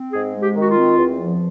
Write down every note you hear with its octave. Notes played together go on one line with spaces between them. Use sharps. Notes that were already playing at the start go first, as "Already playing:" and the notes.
Already playing: C4
G#2 G#4
G#3
G4
D#3
F#4
F4
C4
E2
F3